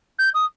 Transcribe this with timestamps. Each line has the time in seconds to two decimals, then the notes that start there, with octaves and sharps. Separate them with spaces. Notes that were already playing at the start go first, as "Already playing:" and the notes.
0.19 G6
0.34 D#6